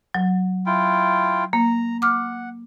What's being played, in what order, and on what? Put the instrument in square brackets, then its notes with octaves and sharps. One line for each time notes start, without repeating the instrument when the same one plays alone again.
[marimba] F#3
[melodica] E4 F4 G5
[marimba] A#3 [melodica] A#5
[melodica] F#5 [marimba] D6 F6